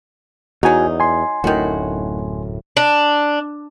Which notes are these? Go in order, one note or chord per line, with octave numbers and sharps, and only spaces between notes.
E2 F#3 D#4 F#4 G#5
G#5 C6
D1 F#2 A2 D#3 F#4
D4